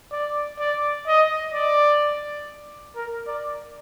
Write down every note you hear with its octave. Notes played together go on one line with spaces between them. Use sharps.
D5
D5
D#5
D5
A#4
D5